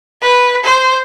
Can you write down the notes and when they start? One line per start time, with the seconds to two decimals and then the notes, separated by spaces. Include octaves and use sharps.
0.22 B4
0.64 C5